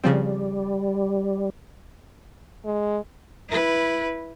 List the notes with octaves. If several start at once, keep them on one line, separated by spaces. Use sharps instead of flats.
C#3 F3 G3 C4
G#3
E4 B4